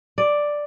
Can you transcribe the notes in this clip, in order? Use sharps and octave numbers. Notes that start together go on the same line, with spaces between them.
D5